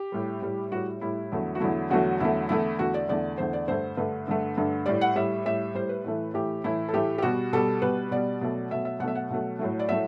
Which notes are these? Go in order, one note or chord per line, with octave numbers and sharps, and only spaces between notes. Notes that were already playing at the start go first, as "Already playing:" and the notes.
Already playing: G4
A2 G3
A2 G3
A2 G3 F#4
A2 G3 E4
E2 D3 F#3 A3
F#4
E2 D3 F#3 A3 E4
E2 D3 F#3 A3 F#4
E2 D3 F#3 A3 E4
E2 D3 A3 E4
E2 D3 A3 F#4
D5
E2 D3 A3 D5
E2 D3 A3 C5
D5
G2 D3 A3 C5
G2 D3 A3 B4
G2 D3 A3
G2 D3 A3
A2 G3 D5
F#5
A2 G3 E5
A2 G3 E5
A2 G3 C5
B4
A2 E3 A3
A2 E3 A3 G4
A2 E3 A3 E4
A4
A2 E3 A3 G4
G4
B2 G3 F#4
B2 G3 A4
B2 G3 B4
B2 G3 D5
B2 F#3 A3
B2 F#3 A3 E5
E5
B2 F#3 A3 E5 F#5
F#5
B2 F#3 A3
A2 F#3 A3
D5
A2 F#3 A3 E5